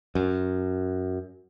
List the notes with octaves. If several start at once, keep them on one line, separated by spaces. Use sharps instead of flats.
F#2